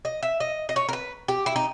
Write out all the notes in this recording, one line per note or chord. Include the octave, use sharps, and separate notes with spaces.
D#5
E5
D#5
D#5
C#5
A#4
B4
G4
E4
D#4